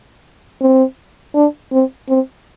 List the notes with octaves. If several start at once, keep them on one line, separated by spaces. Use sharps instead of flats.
C4
D4
C4
C4